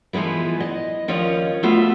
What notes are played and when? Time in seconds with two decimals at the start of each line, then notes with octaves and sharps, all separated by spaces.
0.13 E3 F3 G#3 B3 E4
0.60 D#5
1.08 D#2 F3 C#4 F4 C#5 D#5
1.63 A3 B3 F4 F#4 E5